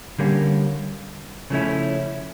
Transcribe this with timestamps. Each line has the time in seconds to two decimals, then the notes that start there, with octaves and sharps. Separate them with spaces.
0.19 D3 G3 A#3 C#4
1.50 C#3 F3 A3 C#4 E4